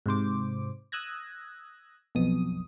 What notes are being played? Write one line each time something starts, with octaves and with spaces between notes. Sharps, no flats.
G#2 C3 C5 D6
D#6 E6 F#6 G#6 A#6
B1 F2 B2 D#6